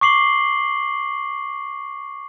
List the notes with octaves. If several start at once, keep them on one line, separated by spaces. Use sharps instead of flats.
C#6 D6 C7 F#7 G7